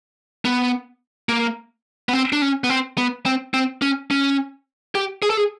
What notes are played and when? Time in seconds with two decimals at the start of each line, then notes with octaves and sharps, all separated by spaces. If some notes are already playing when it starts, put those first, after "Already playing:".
0.45 B3
1.29 A#3
2.09 B3
2.13 C4
2.33 D4
2.42 C#4
2.64 B3
2.70 C4
2.98 B3
3.26 C4
3.54 C4
3.82 C#4
4.11 C#4
4.95 G4
5.22 G#4
5.30 A4
5.37 G#4